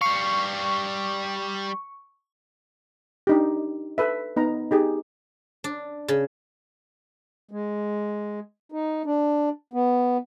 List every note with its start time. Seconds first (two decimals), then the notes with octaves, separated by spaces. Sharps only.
0.01 G3 F5 C#6
3.27 D4 D#4 G4
3.98 A4 B4 E5
4.37 B3 D#4 A#5
4.71 D#4 G4 G#4
5.64 D4
6.08 C#3
7.51 G#3
8.72 D#4
9.06 D4
9.73 B3